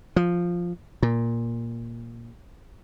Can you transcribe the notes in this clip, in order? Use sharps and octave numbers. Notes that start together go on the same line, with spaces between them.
F3
A#2